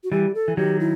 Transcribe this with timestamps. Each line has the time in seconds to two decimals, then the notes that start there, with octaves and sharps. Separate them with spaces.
0.04 F#4
0.12 E3 G3 G4
0.35 A4
0.48 E3
0.57 D#3 F#3 G4
0.80 E4